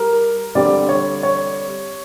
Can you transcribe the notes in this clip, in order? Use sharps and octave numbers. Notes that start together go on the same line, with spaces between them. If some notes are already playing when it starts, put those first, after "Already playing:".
Already playing: G3 A#4
D3 G3 C4 D5
C#5
C#5